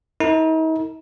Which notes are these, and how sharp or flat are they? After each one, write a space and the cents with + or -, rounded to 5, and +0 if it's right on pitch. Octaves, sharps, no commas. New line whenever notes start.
D#4 +45 A#4 -35